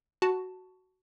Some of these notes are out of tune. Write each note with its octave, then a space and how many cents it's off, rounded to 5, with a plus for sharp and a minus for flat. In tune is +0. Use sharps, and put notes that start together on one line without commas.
F#4 +5 A5 +0